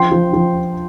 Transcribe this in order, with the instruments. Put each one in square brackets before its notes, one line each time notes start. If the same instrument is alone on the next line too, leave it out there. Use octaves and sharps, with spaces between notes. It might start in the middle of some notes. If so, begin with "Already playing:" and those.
Already playing: [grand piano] F3 G5 C6
F3
F3